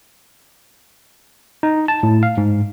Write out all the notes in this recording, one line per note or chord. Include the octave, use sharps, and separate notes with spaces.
D#4
A5
A2
F5
G#2